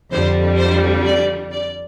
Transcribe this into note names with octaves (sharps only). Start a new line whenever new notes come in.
F2 D3 G3 C5
C5
D5
D5